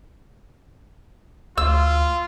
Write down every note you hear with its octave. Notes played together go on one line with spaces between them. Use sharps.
D2 F4 E6